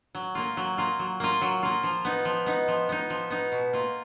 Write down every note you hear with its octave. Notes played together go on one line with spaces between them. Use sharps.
F#3
A#3 F4
F#3
A#3 F4
F#3
A#3 F4
F#3
A#3 F4
F3
B3 D#4
F3
B3 D#4
F3
B3 D#4
F3
B3 D#4
B2
A#3 F4